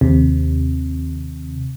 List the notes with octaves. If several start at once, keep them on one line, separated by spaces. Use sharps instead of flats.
D#2 C3